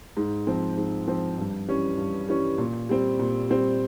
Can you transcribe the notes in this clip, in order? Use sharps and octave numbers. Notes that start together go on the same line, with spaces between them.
G#2
F3 C4
G#2
F3 C4
G2
E3 G3 C#4
G2
E3 G3 C#4
A#2
G3 C4
A#2
G3 C4